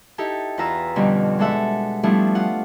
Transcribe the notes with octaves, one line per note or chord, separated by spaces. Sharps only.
D#4 E4 G4 A4
E2 F4 B4 A#5 E6
F2 B2 D3 G3 C#4
G#3 D4 A4 E5 F#5
F3 G3 A3 B3 D4 E4
F4 F#5